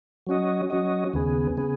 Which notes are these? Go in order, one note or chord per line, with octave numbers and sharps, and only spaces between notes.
F#3 C#4 F#4 D#5
F#3 C#4 F#4 D#5
D#2 C#3 B3 G#4
C#3 B3 G#4